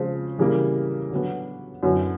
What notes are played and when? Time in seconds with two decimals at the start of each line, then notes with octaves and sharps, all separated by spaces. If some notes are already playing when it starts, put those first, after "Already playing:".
Already playing: C#3 F3 G#3 C4
0.39 C#3 E3 G3 A#3
1.11 D3 F#3 B3
1.83 F#2 D3 F#3 B3 E4